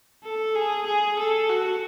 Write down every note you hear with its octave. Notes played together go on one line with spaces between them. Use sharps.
A4
G#4
G#4
A4
F#4